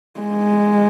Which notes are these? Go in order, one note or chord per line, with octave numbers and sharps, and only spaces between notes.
G#3